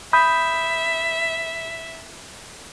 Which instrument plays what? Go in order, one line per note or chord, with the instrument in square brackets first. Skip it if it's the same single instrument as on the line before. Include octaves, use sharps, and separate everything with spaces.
[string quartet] E5 [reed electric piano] B5 D#6 G6